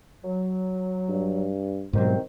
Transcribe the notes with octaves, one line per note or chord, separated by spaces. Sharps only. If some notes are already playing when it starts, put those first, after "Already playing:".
F#3
G2
C2 G#2 B2 D#3 F#3 C4 C5